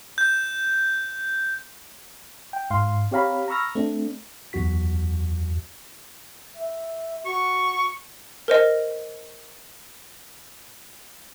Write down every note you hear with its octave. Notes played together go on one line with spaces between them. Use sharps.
G6
G5
G#2 F5 C6
C4 G4 C#5 F5 A#5 B5
A#5 B5 C#6 E6 F6 A#6
A3 C4 D4
E2 F#3 F#4 B6
E5
F#4 C#6
A#4 C5 D#5